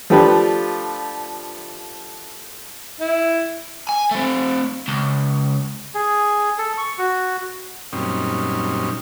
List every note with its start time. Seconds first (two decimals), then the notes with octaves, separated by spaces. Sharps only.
0.10 F3 A3 D4 G4 B4
3.01 E4
3.89 G#5
4.11 A3 C4
4.88 C#2
5.94 G#4
6.58 A4
6.78 C#6
6.98 F#4
7.93 F#2 A#2 G3 C4 C#4 D#4